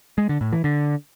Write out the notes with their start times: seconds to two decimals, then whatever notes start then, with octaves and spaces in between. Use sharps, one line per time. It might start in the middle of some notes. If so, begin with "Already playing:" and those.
0.18 G#3
0.29 D3
0.41 A2
0.53 E3
0.64 D3